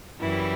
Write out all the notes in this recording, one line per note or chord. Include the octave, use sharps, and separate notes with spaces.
F#2 E3 G3 E4